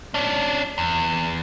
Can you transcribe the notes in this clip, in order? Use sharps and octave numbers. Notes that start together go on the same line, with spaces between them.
C#4 D4
E2